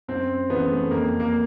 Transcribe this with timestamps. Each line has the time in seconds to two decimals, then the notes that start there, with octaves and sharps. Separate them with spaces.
0.08 F#2 C4
0.50 C#3 E3 B3
0.71 A3
0.91 F2 A#3
1.20 A#3